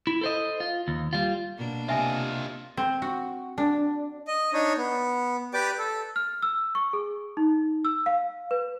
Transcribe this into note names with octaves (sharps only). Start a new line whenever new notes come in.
E4
A4 C5 D#5
F4
D#2
G3 F4
B2 A#3 D4
C3 F4 D#5 E5 G#5
C4
F#4
D4
D#5
D4 D#4 C#5
B3
G4 B4 D5 G5 D6
A4
F6
E6
C#6
G#4
D#4
E6
F5
B4